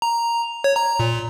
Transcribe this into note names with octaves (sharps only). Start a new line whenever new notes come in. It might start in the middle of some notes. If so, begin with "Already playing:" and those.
A#5
C#5
A#5
A#2